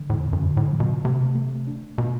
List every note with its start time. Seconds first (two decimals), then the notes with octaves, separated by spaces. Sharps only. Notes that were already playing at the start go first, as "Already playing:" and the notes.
Already playing: D3
0.10 E2 A2
0.33 F#2
0.41 D3
0.57 A2
0.72 F#3
0.80 B2
1.04 C3 A3
1.35 A3
1.67 D4
1.98 B2 A3